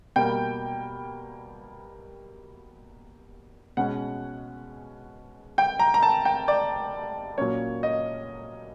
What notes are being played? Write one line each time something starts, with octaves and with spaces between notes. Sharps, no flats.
B2 G3 A#3 G5
B2 G#3 C#4 F#5
G5
A#5
A#5
A5
G5
D5
A#2 F#3 A#3 C#4 C#5
D#5